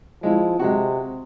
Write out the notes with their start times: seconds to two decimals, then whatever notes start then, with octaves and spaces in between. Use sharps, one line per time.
0.23 F3 G#3 E4
0.59 C3 G#3 F#4